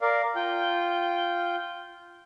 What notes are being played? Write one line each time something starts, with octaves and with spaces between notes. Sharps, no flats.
A#4 D5 F5
F4 G5